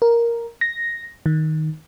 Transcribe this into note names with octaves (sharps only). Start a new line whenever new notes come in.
A#4
A#6
D#3